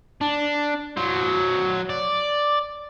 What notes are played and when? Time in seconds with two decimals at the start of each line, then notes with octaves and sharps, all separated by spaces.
0.21 D4
0.97 F#3 C5
1.90 D5